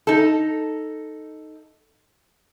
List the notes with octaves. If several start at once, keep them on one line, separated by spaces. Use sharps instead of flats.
D#4 A4